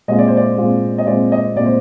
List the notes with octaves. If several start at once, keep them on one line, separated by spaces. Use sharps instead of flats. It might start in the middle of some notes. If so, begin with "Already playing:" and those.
A#2 G#3 C4 F4 D#5
D5
C5
D5
A#2 G#3 C4 F4
D#5
A#2 G#3 C4 F4 D5
D#5
A#2 G#3 C4 F4 D5
C5